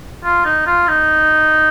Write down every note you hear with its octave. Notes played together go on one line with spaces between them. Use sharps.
F4
D#4
F4
D#4